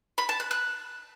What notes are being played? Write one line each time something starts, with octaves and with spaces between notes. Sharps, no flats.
B5
A5
F#6
F#6